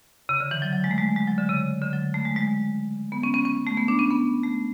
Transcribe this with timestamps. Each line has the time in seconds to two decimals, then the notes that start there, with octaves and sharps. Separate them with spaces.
0.29 C#3
0.40 D3
0.51 E3
0.62 F#3
0.73 F#3
0.84 G#3
0.91 A3
0.98 G#3
1.16 G#3
1.28 F#3
1.38 D3
1.49 C#3
1.82 D3
1.93 F#3
2.14 A3
2.25 G#3
2.36 G#3
3.12 B3
3.23 C#4
3.34 C#4
3.45 C#4
3.67 A3
3.77 B3
3.88 D4
3.99 C#4
4.10 B3
4.43 A3